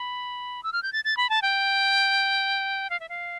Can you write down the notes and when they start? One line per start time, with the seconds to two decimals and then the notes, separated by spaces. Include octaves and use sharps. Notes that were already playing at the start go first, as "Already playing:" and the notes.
Already playing: B5
0.63 E6
0.73 F6
0.83 G6
0.93 A6
1.05 A6
1.17 B5
1.30 A5
1.42 G5
2.90 F5
3.00 E5
3.09 F5